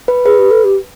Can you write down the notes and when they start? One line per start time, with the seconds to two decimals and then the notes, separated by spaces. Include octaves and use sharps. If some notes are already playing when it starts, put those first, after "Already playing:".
0.08 B4
0.25 G#4 B4
0.39 G4
0.51 A4
0.64 G4